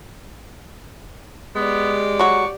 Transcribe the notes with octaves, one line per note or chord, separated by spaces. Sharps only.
G#3 B3 G4 D5
F#3 F#4 C#6